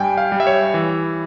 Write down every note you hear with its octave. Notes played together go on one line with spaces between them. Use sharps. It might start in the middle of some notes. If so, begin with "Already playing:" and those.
Already playing: G2 G3 G5 G#5
F5
G3
E5
C#5
E3